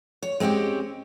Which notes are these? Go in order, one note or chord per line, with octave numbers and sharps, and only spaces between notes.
C#5
G#3 C4 C#4 F#4 G4